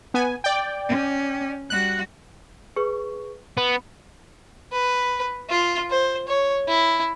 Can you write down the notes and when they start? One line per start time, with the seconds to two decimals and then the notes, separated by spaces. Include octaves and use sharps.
0.14 B3 G#5
0.44 D5 G5
0.88 C#4
1.70 G3 F#4 F#6
2.76 G#4 B4 C#6
3.57 B3 B5
4.72 B4
5.49 F4
5.90 C5
6.28 C#5
6.68 E4